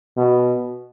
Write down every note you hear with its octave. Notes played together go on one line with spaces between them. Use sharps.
B2